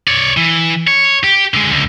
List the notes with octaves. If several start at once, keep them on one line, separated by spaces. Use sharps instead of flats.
C#5 D5
E3
C#5
G4
D3 G#3
C#2 D3